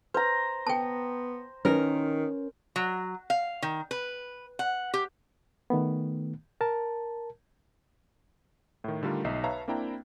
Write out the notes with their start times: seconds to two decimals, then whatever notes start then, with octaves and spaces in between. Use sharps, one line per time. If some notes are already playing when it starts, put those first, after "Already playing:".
0.14 B4 C5 A#5
0.67 B3 G5 A5
1.65 D#3 C#4 E4 A#4 B4
2.76 F#3
3.30 F5
3.62 D#3
3.91 B4
4.59 F#5
4.94 G4
5.70 D#3 A3 B3
6.61 A#4 A5
8.84 A2 D#3
9.03 D3 D#3 G3 A3 F4 A#4
9.24 B1 D#4 D#5 E5 C7
9.44 B4 C#5 E5 F5 A5 A#5
9.68 A#3 C4 D4 E4 G5 A#5